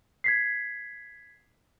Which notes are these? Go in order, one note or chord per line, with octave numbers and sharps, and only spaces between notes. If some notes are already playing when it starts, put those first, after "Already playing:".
G#6 B6 C7